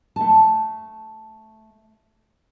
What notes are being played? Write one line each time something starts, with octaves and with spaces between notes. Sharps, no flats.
A3 A5